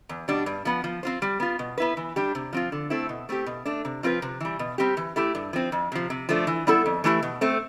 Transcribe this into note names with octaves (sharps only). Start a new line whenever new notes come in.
E2
B2 G3 D4
G2
F3 B3
F3
C4 F4 C5
G3
B3 F4
B2
B3 E4 B4
E3
G3 D4 G4
C3
F3 C4 F4
D3
A3 C4 E4 A4
B2
A3 C4 G4
B2
A3 D4
C3
F3 C4 F4 B4
C3
E3 G3
B2
G3 C4 G4
E3
A3 E4 G4
G2
F3 C4
F2
C3 F3
C3
F3 A3 D4
E3
G3 B3 E4 A4
F2
E3 A3 E4 G4
B2
A3 C4